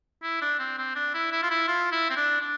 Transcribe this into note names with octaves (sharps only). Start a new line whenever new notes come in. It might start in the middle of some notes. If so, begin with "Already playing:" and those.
E4
D4
C4
C4
D4
E4
E4
F4
E4
F4
E4
C4
D4
D4